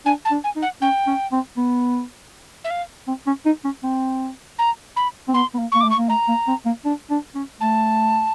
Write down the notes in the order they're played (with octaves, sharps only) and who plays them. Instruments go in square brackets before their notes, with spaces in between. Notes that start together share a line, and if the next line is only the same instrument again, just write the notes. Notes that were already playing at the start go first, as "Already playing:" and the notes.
[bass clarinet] D4 [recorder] G#5
[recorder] A5
[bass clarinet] D4
[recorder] G#5
[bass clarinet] D#4
[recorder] F#5
[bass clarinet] C#4 [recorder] G5
[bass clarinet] C#4
C4
B3
[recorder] E5
F5
[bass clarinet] C4
C#4
D#4
C#4
C4
[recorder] A#5
B5
[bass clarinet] C4
[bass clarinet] B3 [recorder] C6
[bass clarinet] B3
A#3
[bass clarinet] A#3 [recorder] C#6
[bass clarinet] A3 [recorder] D6
[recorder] C#6
[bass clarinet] A#3
[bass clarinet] A3 [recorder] A#5
[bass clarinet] A#3
C4
A#3
D4
D4
C#4
[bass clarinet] A3 [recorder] A5